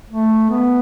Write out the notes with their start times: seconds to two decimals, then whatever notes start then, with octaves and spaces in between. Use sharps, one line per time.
0.10 A3
0.50 B3